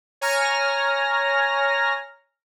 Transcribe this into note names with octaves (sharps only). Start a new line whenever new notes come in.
C#5 G#5 A#5 F6 A#6